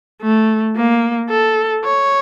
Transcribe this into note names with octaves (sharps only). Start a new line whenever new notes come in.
A3
A#3
A4
C#5